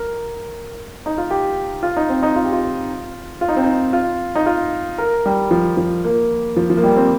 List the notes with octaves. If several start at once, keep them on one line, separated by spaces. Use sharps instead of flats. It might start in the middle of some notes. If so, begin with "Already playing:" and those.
Already playing: A#4
D#4
F4
G4
F4
D#4
C4
D#4
F4
G4
F4
F4
D#4
C4
D#4
F4
D#4
F4
A#4
G3
F3
F3
A#3
F3
F3
A#3
G3
C4